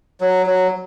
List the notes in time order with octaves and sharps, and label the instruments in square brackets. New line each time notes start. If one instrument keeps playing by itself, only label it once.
[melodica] F#3
F#3